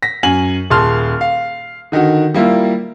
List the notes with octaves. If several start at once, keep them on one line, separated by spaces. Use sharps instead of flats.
A#6 B6
F#2 G#5 F#7
D#1 G#4 A5 C6 F6
F5
D3 D#3 D#4 F#4
G3 A#3 E4 F4